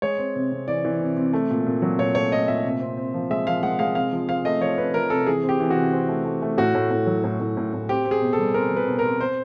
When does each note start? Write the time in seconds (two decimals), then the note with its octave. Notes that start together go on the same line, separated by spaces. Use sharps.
0.02 G#3 C#5
0.18 C4
0.36 C3
0.52 C3
0.68 E3 D5
0.85 E3
1.01 C3
1.17 C3
1.33 A3
1.50 A#2
1.67 A#2
1.82 F#3
1.98 A#2 C#5
2.15 A3 C#5
2.32 A3 D#5
2.48 A#2 E5
2.64 C3
2.80 C4
2.97 C4
3.14 F3
3.30 G#3 E5
3.47 F3 F5
3.63 G#3 F#5
3.79 G#3 F5
3.95 C3 F5
4.12 F3
4.29 F3 F5
4.45 A3 D#5
4.61 F3 C#5
4.78 C3 B4
4.94 F3 A#4
5.10 C3 A4
5.27 E3 G#4
5.43 C4
5.49 G4
5.60 E3
5.70 F#4
5.76 C3
5.93 C4
6.09 A3
6.25 A3
6.42 A3
6.58 A2 F#4
6.75 A2
6.91 A2
7.07 F#3
7.24 A2
7.40 A2
7.57 A2
7.73 A2
7.89 C4 G4
8.06 C4
8.11 G#4
8.22 B2
8.33 A4
8.39 G3
8.54 C4 A#4
8.71 G3
8.76 B4
8.88 B2
8.99 A#4
9.04 C4
9.21 C5